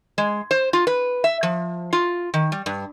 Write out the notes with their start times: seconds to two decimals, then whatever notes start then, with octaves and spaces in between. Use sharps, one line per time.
0.18 G#3
0.51 C5
0.73 F4
0.87 B4
1.24 E5
1.43 F3
1.93 F4
2.34 D#3
2.52 G3
2.66 G2